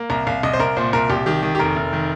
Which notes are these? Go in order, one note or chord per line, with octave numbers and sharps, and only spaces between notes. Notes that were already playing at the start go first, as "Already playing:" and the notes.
Already playing: A#3
C2 A#5
C2 F5
C2 D#5
C5
C2 A#4
A#2 C5
C2 A#4
C2 G4
D#3 G4
D#3
G4
F1 A#4
F1
D#3